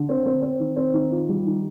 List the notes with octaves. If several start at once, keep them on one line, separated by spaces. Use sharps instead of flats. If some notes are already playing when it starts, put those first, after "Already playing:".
Already playing: D3
C4
C4
C4
D#3
C4
D#3
F4
G3
D#3